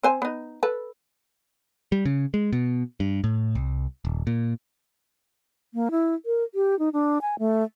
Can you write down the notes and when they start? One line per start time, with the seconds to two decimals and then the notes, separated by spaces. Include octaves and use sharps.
0.03 C4 C5 G#5
0.22 B3 D#4
0.63 A4 B4
1.92 G3
2.05 C#3
2.34 G#3
2.53 B2
3.00 G2
3.24 A2
3.55 C2
4.05 D#1
4.27 A#2
5.74 A#3
5.91 E4
6.26 A#4
6.55 G4
6.79 D#4
6.93 D4
7.22 G#5
7.39 A3